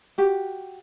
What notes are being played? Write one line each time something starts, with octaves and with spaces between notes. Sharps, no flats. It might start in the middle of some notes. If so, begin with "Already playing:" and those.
F#4 G4